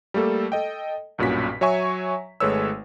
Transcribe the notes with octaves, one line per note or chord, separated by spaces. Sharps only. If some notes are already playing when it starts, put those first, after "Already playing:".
G3 A3 A#3 A4
A4 D#5 G5
B1 G2 A#2 C#4 F#4 B6
F#3 C#5 E5 G#5 C#6
G#1 G#3 A3 B4 C#5 E6